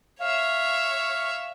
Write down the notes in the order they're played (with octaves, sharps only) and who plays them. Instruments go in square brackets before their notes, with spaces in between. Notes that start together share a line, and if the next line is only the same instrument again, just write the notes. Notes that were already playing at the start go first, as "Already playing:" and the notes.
[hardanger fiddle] C#5 E5 [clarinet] F5